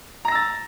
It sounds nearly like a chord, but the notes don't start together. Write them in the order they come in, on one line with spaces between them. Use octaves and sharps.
A#5 A#6 E6 A6